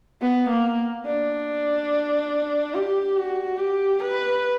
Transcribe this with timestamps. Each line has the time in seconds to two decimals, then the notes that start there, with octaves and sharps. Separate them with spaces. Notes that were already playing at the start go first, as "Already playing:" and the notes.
0.22 B3
0.50 A#3
1.06 D4
2.74 G4
3.17 F#4
3.58 G4
4.00 B4